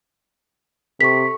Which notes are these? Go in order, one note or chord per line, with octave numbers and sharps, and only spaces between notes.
C3 A4 C#6 B6